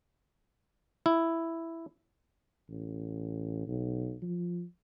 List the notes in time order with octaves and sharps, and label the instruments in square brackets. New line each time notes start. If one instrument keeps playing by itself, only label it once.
[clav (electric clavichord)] E4
[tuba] A1
B1
F3